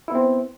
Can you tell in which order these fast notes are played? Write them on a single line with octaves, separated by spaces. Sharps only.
E4 B3 C4